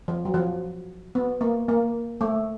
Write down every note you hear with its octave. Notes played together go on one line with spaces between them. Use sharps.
F3
F#3
F3
B3
A#3
A#3
A3